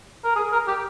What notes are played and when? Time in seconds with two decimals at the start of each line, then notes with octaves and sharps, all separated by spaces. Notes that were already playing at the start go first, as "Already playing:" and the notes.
0.24 A#4
0.36 G#4
0.52 A#4
0.67 G4